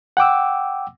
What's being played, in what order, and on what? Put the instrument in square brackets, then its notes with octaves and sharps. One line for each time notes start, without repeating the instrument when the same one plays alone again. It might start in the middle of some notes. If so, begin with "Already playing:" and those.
[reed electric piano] F#5 G5 D6 E6